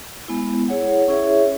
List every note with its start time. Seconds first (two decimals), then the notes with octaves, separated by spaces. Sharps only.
0.28 G#3 B3 E4
0.68 E4 G#4 C#5 F#5
1.08 C#4 E4 G#4 C#5 E5